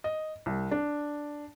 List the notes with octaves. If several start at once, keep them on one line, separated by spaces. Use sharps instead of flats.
D#5
C2
D4